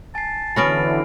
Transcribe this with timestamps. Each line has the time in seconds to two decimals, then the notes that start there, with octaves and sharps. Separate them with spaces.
0.15 G#5 A5 C7
0.56 D3 E3 B3 C#4 F#4 B5 F6 D7